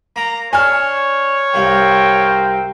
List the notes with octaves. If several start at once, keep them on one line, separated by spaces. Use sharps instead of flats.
A#3 A#5 D6
D4 A4 C#5 G#5 F6
C2 G2 A#3 C4 A#4 G5